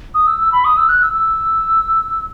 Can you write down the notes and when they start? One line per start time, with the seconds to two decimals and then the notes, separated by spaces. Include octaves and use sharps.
0.14 D#6
0.27 E6
0.40 E6
0.52 B5
0.65 D#6
0.77 E6
0.89 F#6
1.03 E6
1.14 E6